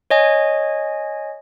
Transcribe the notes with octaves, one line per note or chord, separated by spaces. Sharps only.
C#5 D#5 G#5